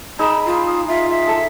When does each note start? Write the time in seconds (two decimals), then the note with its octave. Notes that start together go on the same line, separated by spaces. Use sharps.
0.19 D#4 G#4 A#5 B5 E6
0.46 F4
0.66 D#6
0.88 F4 E5
1.10 E5
1.27 A4